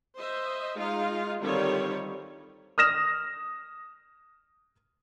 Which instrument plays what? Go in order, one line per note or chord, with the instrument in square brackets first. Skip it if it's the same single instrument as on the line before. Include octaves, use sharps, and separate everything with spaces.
[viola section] C5 D#5 E5
G#3 D#4 F4 F5
D3 D#3 G3 C4 F4 C#5
[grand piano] D#6 F6 A#6 E7